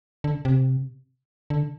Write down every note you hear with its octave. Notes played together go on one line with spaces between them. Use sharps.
D3
C3
D3